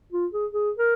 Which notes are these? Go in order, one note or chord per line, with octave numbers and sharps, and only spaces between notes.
F4
G#4
G#4
A#4